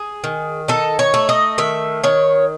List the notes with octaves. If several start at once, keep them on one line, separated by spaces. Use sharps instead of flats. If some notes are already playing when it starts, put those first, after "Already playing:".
Already playing: G#4
D#3
D#4 A4
C#5
A3
D#5
D#3 E5
D#3 C#5